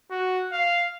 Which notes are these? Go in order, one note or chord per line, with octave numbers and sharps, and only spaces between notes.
F#4
F5